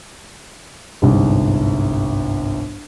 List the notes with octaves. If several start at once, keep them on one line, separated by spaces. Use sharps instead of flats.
G1 C2 G#2